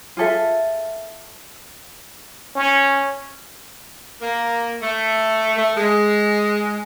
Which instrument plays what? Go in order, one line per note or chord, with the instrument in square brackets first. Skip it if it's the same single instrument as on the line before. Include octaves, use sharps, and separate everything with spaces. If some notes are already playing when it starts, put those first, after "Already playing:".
[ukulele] F4 G#4 A4 E5
[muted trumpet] C#4
[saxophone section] A#3
A3
A3
G#3